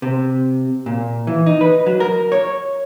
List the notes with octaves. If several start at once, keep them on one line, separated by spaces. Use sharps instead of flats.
C3
A#2
E3
D#4
B4
F#3
A#4
C#5